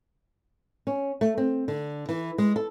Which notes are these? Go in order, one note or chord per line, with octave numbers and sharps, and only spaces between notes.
C#4
A3
C4
D3
E3
G#3
A4